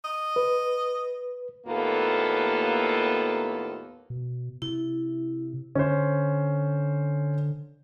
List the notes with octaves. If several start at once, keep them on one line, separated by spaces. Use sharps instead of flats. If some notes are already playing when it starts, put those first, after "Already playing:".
D#5
B4
D#2 A2 A#3 B3 F4 A4
B2
C3 E4
D3 C#4 C5